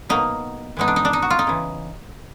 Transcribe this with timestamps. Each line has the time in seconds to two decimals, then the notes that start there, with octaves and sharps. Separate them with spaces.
0.09 B2 F#3 A#3 D#4
0.77 E3 G#3 B3 D#4
0.88 D4
0.96 D#4
1.05 D4
1.13 D#4
1.22 F#4
1.30 F4
1.39 D#4
1.47 C#3 E3